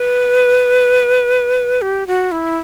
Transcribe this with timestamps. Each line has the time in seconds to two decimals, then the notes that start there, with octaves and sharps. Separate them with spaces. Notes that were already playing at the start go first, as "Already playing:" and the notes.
Already playing: B4
1.82 G4
2.07 F#4
2.32 E4